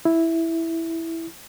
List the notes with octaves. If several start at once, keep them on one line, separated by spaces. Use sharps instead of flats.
E4